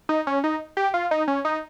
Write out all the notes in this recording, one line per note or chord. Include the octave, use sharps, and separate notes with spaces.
D#4
C#4
D#4
G4
F4
D#4
C#4
D#4